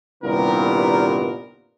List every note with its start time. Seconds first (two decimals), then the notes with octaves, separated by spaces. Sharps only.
0.24 C2 G2 A#2 D#3 B3 A#4